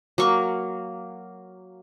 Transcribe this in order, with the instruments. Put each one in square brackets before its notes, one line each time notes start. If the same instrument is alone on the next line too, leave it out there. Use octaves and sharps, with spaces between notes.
[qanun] F#3 A#3 C#6